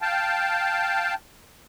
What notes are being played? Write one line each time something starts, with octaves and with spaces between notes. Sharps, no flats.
F5 G5 A5